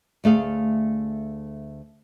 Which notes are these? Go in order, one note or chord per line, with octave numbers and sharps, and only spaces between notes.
D2 A3 G#4 F5